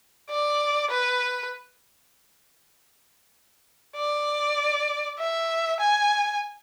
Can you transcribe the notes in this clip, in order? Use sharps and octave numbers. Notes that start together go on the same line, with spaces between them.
D5
B4
D5
E5
G#5